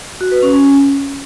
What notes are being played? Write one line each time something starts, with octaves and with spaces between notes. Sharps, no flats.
F#4
B4
C#4
C#4